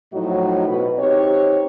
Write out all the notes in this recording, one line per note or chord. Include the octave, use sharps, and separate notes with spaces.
A2 F3 F#3 D#4 F#4 D#5
B2 B4
C4 D#4 G4 C#5